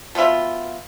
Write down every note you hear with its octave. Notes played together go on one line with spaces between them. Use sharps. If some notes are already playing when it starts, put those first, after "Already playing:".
B2 B3 F4 E5